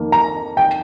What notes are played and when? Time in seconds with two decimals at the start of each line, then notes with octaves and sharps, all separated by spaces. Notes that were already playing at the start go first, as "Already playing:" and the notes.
Already playing: F2 D#3 A#3
0.12 A#5
0.57 G5